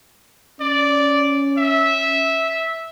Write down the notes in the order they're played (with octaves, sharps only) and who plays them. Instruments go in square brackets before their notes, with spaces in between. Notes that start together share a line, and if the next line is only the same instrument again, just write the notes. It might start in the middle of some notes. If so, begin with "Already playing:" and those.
[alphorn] C#4 [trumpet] D5
[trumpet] E5